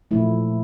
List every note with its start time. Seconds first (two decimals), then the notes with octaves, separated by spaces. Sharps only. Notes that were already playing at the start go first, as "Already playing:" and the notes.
0.11 A#2 F3 A3 E4